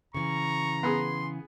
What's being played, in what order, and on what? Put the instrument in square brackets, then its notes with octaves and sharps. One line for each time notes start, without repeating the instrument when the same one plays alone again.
[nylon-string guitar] C#3 E3 [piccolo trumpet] A#5 [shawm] C#6
[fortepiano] B3 G#4 [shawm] C6